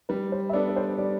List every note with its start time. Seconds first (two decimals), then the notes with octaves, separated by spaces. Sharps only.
0.09 G3 B4
0.32 C5
0.49 E5
0.53 B3 D4 A4 D5
0.69 B4
0.76 C5
0.98 G3 D5